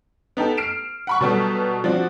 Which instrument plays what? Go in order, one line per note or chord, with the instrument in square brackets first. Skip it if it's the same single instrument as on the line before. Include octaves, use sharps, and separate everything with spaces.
[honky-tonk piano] B3 D#4 G4 A4
F6 C7 D7 E7
F#5 B5 C#6
B2 F#3 G3 B3 A4
F3 C4 D4 F#4